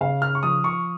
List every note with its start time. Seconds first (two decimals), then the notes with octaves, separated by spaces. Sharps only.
0.01 C#3 F5
0.22 F6
0.35 C#6
0.43 F3 D#6
0.64 C#6